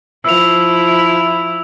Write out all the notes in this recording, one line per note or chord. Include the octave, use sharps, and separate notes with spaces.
F3 E4 E6 F7